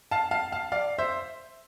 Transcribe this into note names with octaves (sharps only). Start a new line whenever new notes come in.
F5 A5
F5 A5
F5 A5
D5 F5
C5 E5